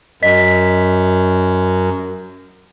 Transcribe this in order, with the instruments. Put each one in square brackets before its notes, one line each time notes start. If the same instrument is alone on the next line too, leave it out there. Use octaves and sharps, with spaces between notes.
[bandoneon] F#2 [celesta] D#5 B6